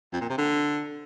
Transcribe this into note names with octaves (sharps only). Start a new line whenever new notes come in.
F2
A#2
C3
D3